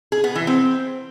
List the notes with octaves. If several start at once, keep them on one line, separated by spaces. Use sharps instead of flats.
G#4
B3
E3
C4